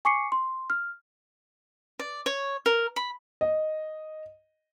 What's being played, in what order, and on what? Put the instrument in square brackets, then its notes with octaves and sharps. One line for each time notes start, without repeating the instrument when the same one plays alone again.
[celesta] G#5 C#6 D6 C7 C#7
C6
F6
[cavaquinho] D5
C#5
A#4
B5
[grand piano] D#5